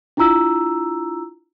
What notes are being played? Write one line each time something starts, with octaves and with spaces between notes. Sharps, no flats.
D4 E4 F4 A#5 E6